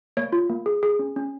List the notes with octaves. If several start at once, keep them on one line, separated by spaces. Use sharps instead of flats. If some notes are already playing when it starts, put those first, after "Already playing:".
A#3 C#5
F4
A#3
G#4
G#4
C#4
C#4